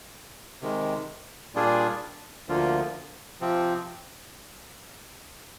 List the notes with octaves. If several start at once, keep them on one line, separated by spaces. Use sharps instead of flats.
C3 D#3 G#3
A#2 G3 D4 F4 G#4
D2 D3 F3 A#3 F4
C3 F3 C4